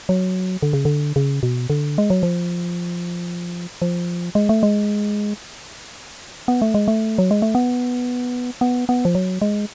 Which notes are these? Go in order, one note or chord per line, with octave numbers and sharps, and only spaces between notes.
F#3
D3
C#3
D3
C#3
B2
D3
G#3
F#3
F3
F3
G#3
A3
G#3
B3
A3
G#3
A3
F#3
G#3
A3
B3
B3
B3
F3
F#3
G#3